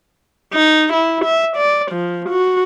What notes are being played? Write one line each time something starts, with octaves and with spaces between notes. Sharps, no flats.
D#4
E4
E5
D5
F3
F#4